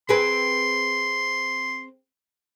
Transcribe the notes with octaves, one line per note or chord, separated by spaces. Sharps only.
C4 G#4 B4 C6